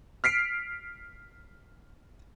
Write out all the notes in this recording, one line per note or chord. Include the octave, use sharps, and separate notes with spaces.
F6 B6 C7 D7